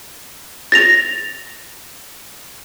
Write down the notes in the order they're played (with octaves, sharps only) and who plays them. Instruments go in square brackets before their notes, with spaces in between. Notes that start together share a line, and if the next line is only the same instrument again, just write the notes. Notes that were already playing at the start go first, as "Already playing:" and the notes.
[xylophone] A6 A#6 F7